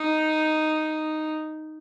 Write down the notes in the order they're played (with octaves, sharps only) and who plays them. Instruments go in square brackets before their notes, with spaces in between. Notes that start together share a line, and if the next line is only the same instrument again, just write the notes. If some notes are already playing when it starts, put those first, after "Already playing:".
Already playing: [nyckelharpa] D#4